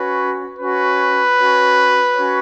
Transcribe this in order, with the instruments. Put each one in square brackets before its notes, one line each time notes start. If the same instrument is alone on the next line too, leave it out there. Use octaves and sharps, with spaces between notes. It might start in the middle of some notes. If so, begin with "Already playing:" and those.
Already playing: [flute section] C#4 F#4 C#5 [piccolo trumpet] B4
[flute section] C#4 F#4 C#5 [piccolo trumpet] B4
[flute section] C#4 F#4 C#5
C#4 F#4 C#5